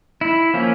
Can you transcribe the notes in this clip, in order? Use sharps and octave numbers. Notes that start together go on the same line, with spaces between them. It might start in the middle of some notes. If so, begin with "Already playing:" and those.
E4
F3 A#3 C#4